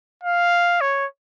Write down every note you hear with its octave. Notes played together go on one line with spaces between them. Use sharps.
F5
C#5